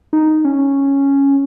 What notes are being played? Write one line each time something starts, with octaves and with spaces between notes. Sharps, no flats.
D#4
C#4